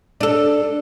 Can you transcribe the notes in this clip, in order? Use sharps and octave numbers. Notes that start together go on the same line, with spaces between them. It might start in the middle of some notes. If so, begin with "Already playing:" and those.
D4 A4